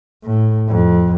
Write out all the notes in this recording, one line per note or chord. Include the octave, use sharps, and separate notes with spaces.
A2
F2